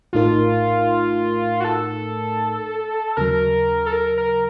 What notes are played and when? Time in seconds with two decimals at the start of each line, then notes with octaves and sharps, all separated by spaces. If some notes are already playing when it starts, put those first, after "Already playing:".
0.13 A#1 A2 A3 D#4 F4 A#4
1.60 F#4
1.65 A4
3.17 D#2 C#3 F#3 A#4
3.86 A4
3.93 A#4
4.17 A#4